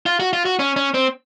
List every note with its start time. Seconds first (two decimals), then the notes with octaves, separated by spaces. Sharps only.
0.06 F4
0.20 F#4
0.33 F4
0.45 F#4
0.59 C#4
0.76 C#4
0.94 C4